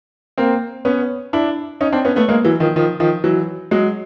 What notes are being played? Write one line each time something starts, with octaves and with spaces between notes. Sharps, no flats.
A#3 C4
B3 C#4
D4 E4
C#4 D#4
C4 D4
B3 C#4
A3 B3
G#3 A#3
E3 F#3
D#3 F3
D#3 F3
D#3 F3
E3 F#3
F#3 G#3